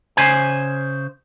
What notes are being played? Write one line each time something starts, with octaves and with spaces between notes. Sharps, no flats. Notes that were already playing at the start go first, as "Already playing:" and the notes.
C#3 C5 G#5